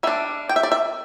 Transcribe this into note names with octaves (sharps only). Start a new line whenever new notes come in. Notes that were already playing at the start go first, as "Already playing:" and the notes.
G3 D4 E5
G5
E5
D5
E5